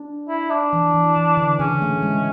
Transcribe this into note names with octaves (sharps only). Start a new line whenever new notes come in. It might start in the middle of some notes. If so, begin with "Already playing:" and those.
Already playing: D4
E4
D4
E3
E3
E3
D3
C#3 C#4
A3
G#3